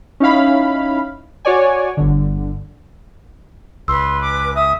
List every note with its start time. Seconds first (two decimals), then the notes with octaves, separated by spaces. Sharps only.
0.20 C#4 D#4 E4 F5 B5
1.45 F#4 C#5 D5 G#5
1.97 G1 D3
3.88 C#2 B4 C6 E6
4.21 D6
4.55 E5 D#6